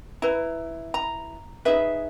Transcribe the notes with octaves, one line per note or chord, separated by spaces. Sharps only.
E4 B4 A#5
A#5
D#4 G#4 B4 E5